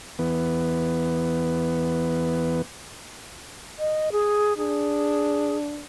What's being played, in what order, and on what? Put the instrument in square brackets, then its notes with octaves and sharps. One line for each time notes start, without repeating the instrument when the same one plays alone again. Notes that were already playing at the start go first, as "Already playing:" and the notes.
[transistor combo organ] E2 B3
[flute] D#5
G#4
[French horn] D4 [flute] G#4